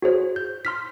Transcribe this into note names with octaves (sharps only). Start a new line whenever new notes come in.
F#4 G#4 C5 C#5
G6
C6 F6 B6